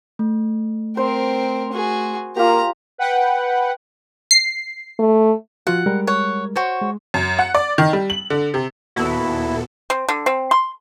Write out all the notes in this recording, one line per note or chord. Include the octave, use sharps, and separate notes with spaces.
A3
C4 A#4 C5
F#4 G#4
A#3 F4 G4 A#5
B4 F#5 G5
C7
A3
F3 F4 F#4 F#5
G3 G#3 A#4
C#5 F#5
F#4 C5 C#5
G#3
F#2
F#5
D5
D#3
G3
F#7
D3
C3
D#2 A#2 B3 E4 F#4 A4
C4
D3
C4
C6